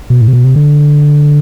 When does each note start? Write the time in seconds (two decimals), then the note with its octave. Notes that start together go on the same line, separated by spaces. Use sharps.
0.10 B2
0.21 A2
0.28 C3
0.33 B2
0.44 C3
0.56 D3